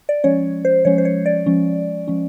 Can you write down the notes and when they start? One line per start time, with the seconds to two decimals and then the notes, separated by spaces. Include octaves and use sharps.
0.09 D5
0.24 F3 G#3 C#4 C#5
0.65 C5
0.85 F3 G#3 C#4 C#5
0.98 C5
1.05 C#5
1.26 D5
1.46 F3 G#3 C#4
2.08 F3 G#3 C#4